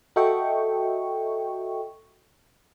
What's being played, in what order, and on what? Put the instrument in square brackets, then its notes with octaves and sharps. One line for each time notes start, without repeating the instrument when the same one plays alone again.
[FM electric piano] F#4 A4 D#5 E5 G5 C#6